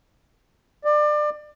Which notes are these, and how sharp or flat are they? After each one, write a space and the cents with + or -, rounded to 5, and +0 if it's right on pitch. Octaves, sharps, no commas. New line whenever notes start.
D5 +25